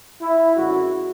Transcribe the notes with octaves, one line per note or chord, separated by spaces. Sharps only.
E4
F#2 D3 G#3 F#4